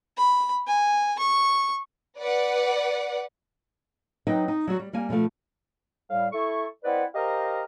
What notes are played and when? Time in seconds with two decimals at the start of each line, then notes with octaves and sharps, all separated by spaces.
0.18 B5
0.67 G#5
1.19 C#6
2.18 B4 D5 F#5
4.27 F#3 D#4 B4 D#5 G5
4.48 D#4
4.67 F#3 G3 F#4
4.80 G3
4.93 G3 A#3 G#5
5.09 B2 D3 F3 A3
6.10 A2 G3 F5
6.33 E4 A4 C#6
6.84 C4 E4 B4 D5 D#5 F#5
7.14 G4 A#4 C5 D#5 F5 A#5